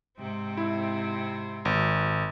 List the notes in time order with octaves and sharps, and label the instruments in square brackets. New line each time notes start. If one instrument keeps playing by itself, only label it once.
[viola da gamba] G#2 C3 C4
[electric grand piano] E4
G#1